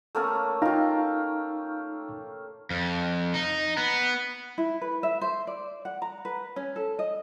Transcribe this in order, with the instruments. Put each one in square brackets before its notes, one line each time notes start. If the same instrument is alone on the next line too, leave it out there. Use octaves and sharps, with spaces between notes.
[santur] A3 A#3 C#4
[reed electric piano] D#4 F5 A#5 [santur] F4 G4
[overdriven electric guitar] F2
D#4
B3
[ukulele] E4
B4
E5
C5
D5
F#5
A#5
B4
C#4
A4
D#5